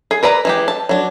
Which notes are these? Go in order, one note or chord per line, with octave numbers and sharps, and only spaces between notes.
G#4
A#4 B4 D5 A#5
E3 G#3 G4
A5
F#3 D4